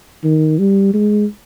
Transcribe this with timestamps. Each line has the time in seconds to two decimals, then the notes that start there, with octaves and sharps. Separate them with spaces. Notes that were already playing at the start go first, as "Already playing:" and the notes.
0.24 D#3
0.59 G3
0.94 G#3